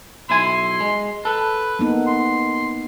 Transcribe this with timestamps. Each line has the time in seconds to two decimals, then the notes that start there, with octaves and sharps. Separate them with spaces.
0.30 B1 E4 G#5 C6
0.80 G#3
1.25 A4 B4
1.79 A#3 B3 D#4
2.07 C6